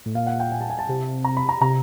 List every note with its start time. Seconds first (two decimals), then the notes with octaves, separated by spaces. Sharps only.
0.06 A2
0.15 A#2 F5
0.27 F#5
0.40 G5
0.52 G#5
0.61 A5
0.70 G#5
0.79 A5
0.89 C3
1.25 A#5
1.37 B5
1.49 A#5
1.61 C3 A#5